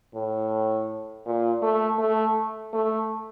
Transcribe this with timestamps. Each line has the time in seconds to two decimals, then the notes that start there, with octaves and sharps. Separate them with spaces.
0.15 A2
1.26 A#2
1.62 A3
1.99 A3
2.74 A3